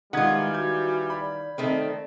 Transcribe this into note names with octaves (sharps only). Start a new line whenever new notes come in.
D#3 E3 G3 G#3 F4 F#5 G#6
F#4 G6 G#6
D5 B5
D#3 A3 C4 D5